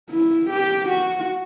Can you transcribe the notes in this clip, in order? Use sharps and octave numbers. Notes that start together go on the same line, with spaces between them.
E4
G4
F#4